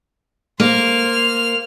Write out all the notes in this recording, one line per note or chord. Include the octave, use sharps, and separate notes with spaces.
A#3 C5 F6